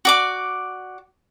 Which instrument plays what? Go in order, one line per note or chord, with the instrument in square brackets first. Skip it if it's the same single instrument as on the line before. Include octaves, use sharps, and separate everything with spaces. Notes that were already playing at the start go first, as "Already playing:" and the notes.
[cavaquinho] F#4 D5 D6